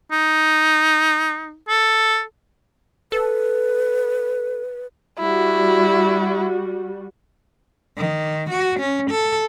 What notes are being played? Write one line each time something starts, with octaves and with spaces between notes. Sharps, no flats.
D#4
A4
A4 B4
G3 E4 F#4
D#3
F#4
C#4
A4